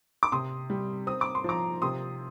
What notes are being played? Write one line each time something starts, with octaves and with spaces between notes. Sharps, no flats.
D6
C3 C6 D#6
G3
C4 D#6
D6
C6
F3 A#5 D6
C3 C6 D#6